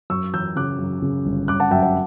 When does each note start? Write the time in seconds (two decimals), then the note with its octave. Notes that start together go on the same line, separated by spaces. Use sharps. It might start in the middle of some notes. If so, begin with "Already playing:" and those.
0.10 F#2 C#6 E6
0.34 E3 E6 G6
0.56 C#3 D6 F#6
0.79 F#2
1.02 C#3
1.26 G1
1.48 G1 D6 F#6
1.60 F#5 A5
1.71 F#2 E5 G5
1.83 F#5 A5